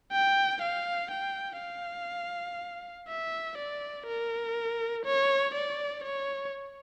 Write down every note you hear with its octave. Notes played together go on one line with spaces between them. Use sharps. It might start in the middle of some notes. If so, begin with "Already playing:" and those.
G5
F5
G5
F5
E5
D5
A#4
C#5
D5
C#5